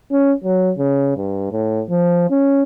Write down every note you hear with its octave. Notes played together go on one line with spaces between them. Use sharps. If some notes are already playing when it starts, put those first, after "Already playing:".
C#4
F#3
C#3
G2
A2
F3
C#4